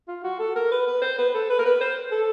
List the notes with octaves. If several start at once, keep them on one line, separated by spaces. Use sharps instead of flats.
F4
F#4
A4
A#4
B4
B4
C5
B4
A4
B4
A#4
B4
C5
A4